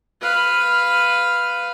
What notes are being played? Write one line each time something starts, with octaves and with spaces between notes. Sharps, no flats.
B4 F5